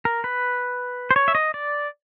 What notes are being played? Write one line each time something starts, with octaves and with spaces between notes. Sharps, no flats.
A#4
B4
C5
C#5
E5
D#5
D5